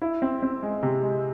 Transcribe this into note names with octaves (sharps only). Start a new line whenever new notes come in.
E4
C4
C4
G#3
C3
G#3